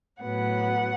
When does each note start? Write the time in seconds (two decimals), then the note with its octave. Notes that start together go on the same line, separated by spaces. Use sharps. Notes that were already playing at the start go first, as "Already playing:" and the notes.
0.23 A2 F#3 B3 F#5